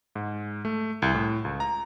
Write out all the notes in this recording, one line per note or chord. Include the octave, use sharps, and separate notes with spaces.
G#2
A3
C2
A2
C#2
A#5